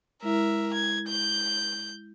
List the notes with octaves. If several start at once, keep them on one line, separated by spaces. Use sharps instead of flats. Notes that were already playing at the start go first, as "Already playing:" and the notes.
G#3 E4 A#4 E5
G#6
G6